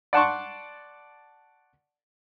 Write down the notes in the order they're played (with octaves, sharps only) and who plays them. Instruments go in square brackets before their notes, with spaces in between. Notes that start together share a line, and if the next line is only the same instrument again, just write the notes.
[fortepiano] D5 F#5 A5 C6 C#6